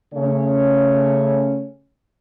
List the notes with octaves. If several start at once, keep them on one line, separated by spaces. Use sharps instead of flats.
C#3 A3 C#4 C#5